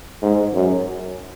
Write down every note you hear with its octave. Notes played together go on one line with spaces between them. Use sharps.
G#2
F#2